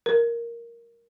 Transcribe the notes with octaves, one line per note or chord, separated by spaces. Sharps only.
A#4